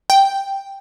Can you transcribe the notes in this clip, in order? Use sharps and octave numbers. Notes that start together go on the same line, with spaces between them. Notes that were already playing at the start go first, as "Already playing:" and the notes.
G5